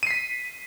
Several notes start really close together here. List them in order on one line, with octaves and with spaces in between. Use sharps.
D#7 C7 B6